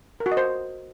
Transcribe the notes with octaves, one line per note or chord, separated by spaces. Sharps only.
A#4
F#4
D#5
C5